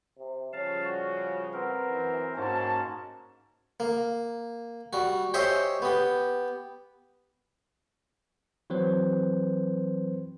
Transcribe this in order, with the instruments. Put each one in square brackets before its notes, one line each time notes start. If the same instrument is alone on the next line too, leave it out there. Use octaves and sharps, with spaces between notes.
[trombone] C3
[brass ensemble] C#3 F3 G3 [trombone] C#4 [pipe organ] F5 A5
[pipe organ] F#4
[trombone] B3 [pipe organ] C4 A#4
[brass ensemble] F#2 E3
[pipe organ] G#2 C#4 [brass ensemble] A#3 F#4 A5 [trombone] C5
[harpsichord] A#3
G3 F#4
G4 C5 C#5 D#5 E5 G#5
B3 G4
[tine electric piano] E3 F#3 C4 B4 C5